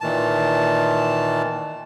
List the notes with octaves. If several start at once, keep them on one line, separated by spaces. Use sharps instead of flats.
A#2 D#3 E3 A5